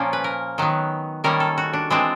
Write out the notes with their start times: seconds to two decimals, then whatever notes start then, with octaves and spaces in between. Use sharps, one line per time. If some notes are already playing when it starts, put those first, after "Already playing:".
Already playing: A#2 F3 A#3 C#4
0.13 B4
0.24 A#4
0.58 D#3 F#3 B3
1.24 D#3 G3 A#3 C#4 A#4
1.40 A4
1.58 F#4
1.73 D4
1.90 E3 G#3 C4 D4